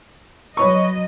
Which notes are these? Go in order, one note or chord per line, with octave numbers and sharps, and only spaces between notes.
F#3 B4 C#5 D#5 C#6